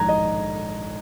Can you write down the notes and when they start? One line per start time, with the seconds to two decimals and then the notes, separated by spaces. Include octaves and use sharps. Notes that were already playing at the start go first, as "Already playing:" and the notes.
Already playing: A#1 G#2 D#3 A#5 G#6
0.08 D#5